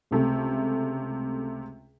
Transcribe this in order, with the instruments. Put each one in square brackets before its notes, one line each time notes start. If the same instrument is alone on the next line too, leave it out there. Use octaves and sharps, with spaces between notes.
[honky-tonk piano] C#2 C3 A3